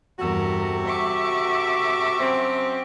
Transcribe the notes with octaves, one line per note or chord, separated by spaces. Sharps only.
E2 G2 C3 F#4 A4 A#4
E5 C#6 D6
F#2 C4